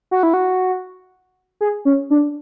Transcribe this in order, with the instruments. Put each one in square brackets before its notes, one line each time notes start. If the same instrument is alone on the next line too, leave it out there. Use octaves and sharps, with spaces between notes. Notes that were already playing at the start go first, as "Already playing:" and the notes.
[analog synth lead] F#4
E4
F#4
G#4
C#4
D4